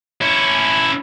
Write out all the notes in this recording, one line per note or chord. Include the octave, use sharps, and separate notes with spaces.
C#4 E4